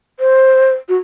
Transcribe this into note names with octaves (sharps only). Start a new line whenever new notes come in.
C5
F#4